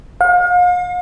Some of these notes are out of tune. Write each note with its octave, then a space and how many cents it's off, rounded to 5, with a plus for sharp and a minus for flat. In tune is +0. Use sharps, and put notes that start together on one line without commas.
F5 +40